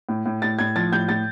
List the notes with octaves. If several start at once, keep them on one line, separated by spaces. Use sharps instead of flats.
A2
A2
A2 A6
A2 G#6
F3 A6
A2 G6
A2 A6